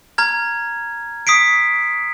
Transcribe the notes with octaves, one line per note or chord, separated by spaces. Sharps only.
A#5 F6 G#6
D#6 B6 C7 D7